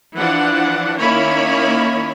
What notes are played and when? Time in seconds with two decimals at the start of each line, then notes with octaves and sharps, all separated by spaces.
0.15 E3 F3 D4 F#5
0.99 D#3 A#3 C#4 E4 C#5 B5